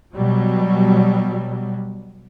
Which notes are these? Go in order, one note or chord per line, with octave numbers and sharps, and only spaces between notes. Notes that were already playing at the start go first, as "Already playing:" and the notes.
B2 F#3 G3